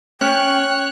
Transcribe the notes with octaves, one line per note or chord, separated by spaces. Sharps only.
C#4 C#5 G5 F#6